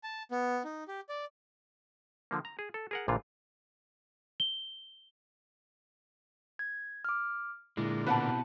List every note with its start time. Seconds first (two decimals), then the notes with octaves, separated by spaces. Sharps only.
0.04 A5
0.31 B3
0.65 D#4
0.88 G4
1.09 D5
2.31 D3 F3 A#3
2.45 A#5
2.59 G#4
2.74 A4
2.91 G#4 A#4 F#5
3.08 A#1 A#2 D3 E3 F4
4.40 G7
6.59 G#6
7.05 D6 F6
7.77 A#2 D3 G#3 E4
8.07 B2 C4 B4 F#5 A5